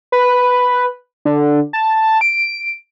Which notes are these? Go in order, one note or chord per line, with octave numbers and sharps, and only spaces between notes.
B4
D3
A5
D7